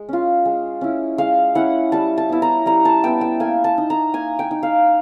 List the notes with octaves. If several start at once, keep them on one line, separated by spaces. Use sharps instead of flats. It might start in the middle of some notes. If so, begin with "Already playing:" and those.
Already playing: G#3
C#4 F4
G#3
C#4 E4
G#3 F5
C#4 E4 F#5
G3 A5
A5
B3 E4
A#5
G3 A#5
A5
B3 E4 G5
G5
A#3 G#5
A5
D#4
A#5
A#3 G#5
G5
D#4
F5